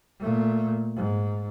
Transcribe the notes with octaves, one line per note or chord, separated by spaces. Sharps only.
A#2 A3
G#2